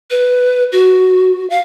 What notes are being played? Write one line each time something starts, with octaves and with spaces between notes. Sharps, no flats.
B4
F#4
F5